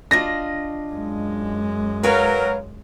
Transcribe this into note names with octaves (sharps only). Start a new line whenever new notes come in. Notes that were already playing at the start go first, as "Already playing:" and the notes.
D4 F4 D#5 A#6
F#2 G#3
F#3 A#4 B4 C#5 F5